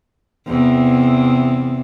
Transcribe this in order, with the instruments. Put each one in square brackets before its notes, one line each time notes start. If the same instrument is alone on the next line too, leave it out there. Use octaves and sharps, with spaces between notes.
[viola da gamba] E2 C3